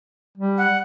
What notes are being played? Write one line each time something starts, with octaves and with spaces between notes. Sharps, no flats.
G3
F#5